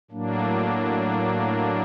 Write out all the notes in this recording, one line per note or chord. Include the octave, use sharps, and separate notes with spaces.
A2 F#3 A#3 D4